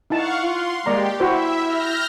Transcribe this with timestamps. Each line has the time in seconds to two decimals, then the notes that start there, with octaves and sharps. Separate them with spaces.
0.10 D#4 E4 F5 F#5 A5 C#6
0.43 F4 C6
0.86 G#3 A#3 G4 D5 A#5
1.20 E4 F#4 C5 E5
1.64 F6 G6 A#6